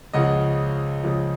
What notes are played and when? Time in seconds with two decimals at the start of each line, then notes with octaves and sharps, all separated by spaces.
0.13 C#2 C#3 F3 D#5 F#5
1.03 C#2 C#3 F3